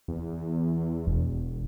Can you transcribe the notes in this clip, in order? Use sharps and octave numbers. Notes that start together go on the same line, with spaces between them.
E2
E1